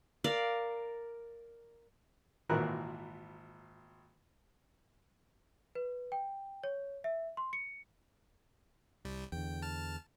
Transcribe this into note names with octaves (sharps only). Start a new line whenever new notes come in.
A#4 D5 F5
G#1 A#2 E3 F#4 A#4 F#6
B4
G5
C#5
E5
C6
C#7
C2 G3
E2 D3 G5
A5 F6